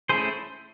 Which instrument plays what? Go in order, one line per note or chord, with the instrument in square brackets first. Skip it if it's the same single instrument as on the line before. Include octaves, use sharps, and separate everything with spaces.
[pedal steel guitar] A3 C#4 E4 G#4 C5